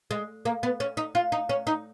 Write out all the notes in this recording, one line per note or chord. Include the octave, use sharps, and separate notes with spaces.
G#3
A#3
B3
C#4
D#4
F4
D#4
C#4
D#4